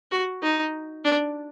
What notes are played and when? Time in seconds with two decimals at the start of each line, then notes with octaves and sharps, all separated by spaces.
0.11 F#4
0.43 D#4
1.04 D4